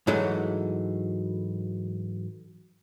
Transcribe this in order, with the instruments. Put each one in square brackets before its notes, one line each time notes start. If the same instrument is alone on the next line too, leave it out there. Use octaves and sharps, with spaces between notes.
[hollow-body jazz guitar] G#2 E3 F#3 G#3 A3